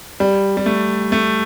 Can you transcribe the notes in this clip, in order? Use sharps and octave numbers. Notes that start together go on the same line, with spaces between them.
G3
G3
A3
A3